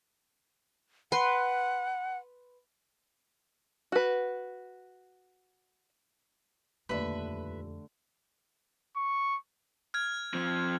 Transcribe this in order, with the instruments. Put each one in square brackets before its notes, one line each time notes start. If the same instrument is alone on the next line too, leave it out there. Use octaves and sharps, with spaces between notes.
[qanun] B4 C6 [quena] F#5
[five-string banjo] F#4 B4
[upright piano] D#1 D5 [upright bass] F2 [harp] D3 A3 [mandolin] B4 E5
[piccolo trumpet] C#6
[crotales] F6 G#6
[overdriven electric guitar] F3 C4